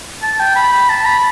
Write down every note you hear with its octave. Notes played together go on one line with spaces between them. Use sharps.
A5
G5
B5
B5
A5
B5